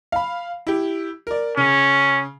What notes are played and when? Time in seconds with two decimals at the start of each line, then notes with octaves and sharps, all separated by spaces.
0.12 F5 B5
0.67 E4 G4
1.27 A#4 D5
1.57 C#3 C#4